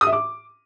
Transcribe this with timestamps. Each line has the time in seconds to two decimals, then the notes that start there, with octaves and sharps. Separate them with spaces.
0.01 D#6
0.07 E5
0.12 D6